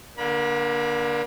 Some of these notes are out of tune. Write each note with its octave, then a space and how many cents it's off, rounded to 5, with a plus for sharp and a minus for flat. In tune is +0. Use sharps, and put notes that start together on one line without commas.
D3 +0 A#3 +30 B5 -35